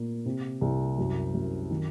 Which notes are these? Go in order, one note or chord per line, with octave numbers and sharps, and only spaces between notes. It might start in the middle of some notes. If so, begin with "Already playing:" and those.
Already playing: A#2 A#3
C3
C2
F#2
F#2
D#3